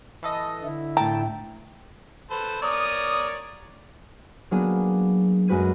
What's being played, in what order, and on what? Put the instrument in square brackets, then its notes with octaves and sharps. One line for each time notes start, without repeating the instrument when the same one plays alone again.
[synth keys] E3 A4 D#5
[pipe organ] D3 E4
[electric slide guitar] A2 G5 [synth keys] A5 [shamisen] A#5
[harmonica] A4 B4 C5
[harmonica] A#4 C#5 D5 [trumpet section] D#6
[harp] F#3 A#3 B3 D4 G#4
F#2 G#3 F#4 B4 G#6 D#7